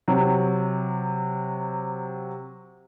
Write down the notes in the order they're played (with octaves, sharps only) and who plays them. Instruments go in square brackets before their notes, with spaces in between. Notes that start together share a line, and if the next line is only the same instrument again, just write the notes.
[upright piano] C3 F#3